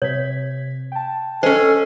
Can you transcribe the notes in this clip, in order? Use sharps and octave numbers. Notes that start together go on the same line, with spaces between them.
C3 C#5 G#6 B6
G5 A5
C#4 G#4 A4 C5 D#5